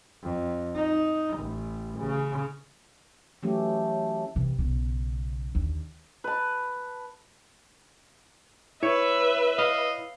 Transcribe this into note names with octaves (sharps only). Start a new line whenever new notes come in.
F2
D#4
A1
C#3
E3 F#3 A3 C#4 G4
C3 E3
B1 C#3
D#2 D3
B4 A5
E4 B4 C#5 E5
D#5 F5